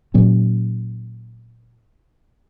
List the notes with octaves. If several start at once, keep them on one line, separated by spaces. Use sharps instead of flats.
A#2 F#3 C#4